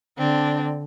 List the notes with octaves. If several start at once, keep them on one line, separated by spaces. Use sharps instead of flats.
D3 C4 D4